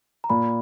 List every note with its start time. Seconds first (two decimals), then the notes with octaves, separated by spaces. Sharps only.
0.24 A#5
0.29 A#2 B5